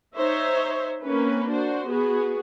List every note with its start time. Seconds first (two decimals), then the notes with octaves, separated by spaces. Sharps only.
0.15 D#4 C5 C#5 E5
1.03 A#3 C4 C#4 B4
1.49 D4 F#4 C5
1.88 B3 F#4 G#4